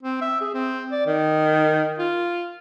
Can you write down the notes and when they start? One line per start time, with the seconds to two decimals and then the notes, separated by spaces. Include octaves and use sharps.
0.03 C4
0.21 E5
0.41 G#4
0.54 C4
0.92 D5
1.07 D#3
1.99 F4